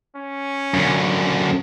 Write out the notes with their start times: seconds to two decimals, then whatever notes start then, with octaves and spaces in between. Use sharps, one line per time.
0.16 C#4
0.74 F#2 D3